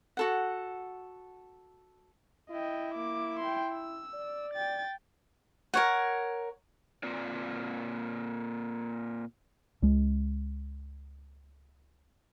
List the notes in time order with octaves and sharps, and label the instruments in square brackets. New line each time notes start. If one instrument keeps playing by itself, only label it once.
[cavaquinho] F#4 A4 F#5
[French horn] E4 [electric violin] D#5 G5
[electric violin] A#3 D6
G5 C6
E6
[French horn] D5
[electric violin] G5 A6
[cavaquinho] A#4 C#5 F#5
[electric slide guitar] A#2 C4 F4 D5
[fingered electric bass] C#2 G#3